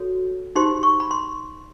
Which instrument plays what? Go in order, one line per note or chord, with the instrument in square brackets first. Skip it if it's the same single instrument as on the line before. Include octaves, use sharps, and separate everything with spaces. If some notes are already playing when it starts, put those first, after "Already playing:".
Already playing: [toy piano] F#4 A4 C#5
D#4 G4 C5 C6
C#6
B5
C6